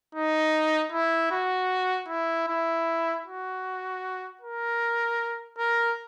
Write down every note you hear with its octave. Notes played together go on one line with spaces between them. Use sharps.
D#4
E4
F#4
E4
E4
F#4
A#4
A#4